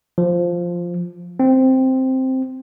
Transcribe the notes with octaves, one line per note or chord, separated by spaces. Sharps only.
F3
C4